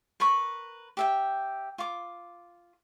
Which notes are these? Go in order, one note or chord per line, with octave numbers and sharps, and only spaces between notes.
A#4 B4 B5 C#6
G4 E5 G5
F4 D6